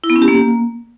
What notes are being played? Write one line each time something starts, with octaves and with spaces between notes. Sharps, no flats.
E4
B3
C#4
G4
A#3